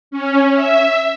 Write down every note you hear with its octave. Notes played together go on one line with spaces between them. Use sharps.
C#4
E5